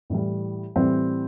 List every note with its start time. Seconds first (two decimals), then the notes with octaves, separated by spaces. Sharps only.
0.10 A2 E3 G3
0.76 A2 E3 G3 C4